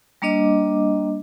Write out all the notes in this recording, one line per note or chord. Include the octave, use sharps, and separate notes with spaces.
G3 A#3 D4 D#5 D6